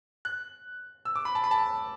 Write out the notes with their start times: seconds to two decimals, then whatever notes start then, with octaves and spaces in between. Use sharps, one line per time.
0.25 F#6
1.05 E6
1.16 D6
1.25 B5
1.35 A5
1.44 B5
1.51 A5